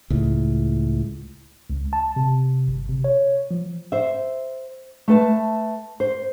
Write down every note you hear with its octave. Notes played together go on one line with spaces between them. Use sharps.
C#2 A2
C#2
A5
C3
G1
C3
C#5
F3
C5 E5
A3 B4 A5
C5